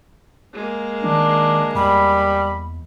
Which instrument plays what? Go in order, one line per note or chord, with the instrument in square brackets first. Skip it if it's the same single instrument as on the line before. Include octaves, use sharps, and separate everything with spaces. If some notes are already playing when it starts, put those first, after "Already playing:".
[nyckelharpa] G#3 A#3
[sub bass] D#3 [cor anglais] D4
[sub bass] E2 [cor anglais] G3 [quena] B5